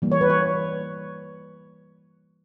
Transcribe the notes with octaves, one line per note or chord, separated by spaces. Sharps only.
E3 G3 A#3
C#5
B4
C#5